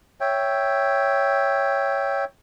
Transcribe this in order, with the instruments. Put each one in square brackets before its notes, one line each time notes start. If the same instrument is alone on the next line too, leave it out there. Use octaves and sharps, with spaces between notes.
[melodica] C#5 E5 G5